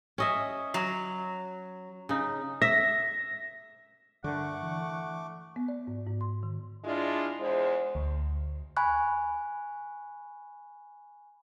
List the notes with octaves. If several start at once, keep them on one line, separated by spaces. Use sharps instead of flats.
C#4 D#5 E5
F#3
C#3 D#4
E5 A#6
G2 D3 A3 A#4 F#5 C#6 D6
E3
B3
D5
G#2
G#2
C6
D#3
G#3 D4 E4 F4
E2 G#3 C5
D2
G#5 B5 C#6 F#6